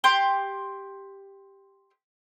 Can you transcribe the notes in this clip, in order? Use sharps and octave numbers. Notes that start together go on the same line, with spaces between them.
G4 C6 D6